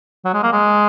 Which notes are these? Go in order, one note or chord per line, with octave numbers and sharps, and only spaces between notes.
F#3
G#3
A#3
G#3